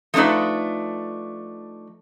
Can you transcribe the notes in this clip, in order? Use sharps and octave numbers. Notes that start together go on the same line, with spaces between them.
F3 A3 D4 D#4 B4